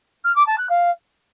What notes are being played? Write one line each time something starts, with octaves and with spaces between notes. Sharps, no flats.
F6
D6
A5
F#6
F5